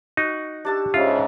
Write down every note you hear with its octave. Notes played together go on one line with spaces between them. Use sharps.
D#4 F#4
D4 G4 A5 E6
G#2 C#3 F4 E5